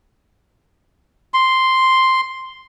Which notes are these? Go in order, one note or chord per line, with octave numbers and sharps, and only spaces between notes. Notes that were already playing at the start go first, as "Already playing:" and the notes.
C6